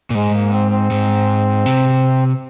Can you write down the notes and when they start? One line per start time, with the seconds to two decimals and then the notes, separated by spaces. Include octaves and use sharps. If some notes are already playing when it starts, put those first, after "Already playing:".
0.10 A#2
0.15 G#2 G#3
0.34 A#3
0.53 C4
0.72 C4
0.91 G#2
1.66 C3